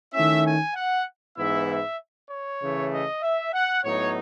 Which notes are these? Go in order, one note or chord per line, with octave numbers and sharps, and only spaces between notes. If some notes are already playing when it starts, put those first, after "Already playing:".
D#3 A3 C#4 E4 E5
G#5
F#5
G#2 E3 B3 E4 E5
E5
C#5
C#3 E3 A3
D#5
E5
F#5
A2 F#3 B3 D#4 C#5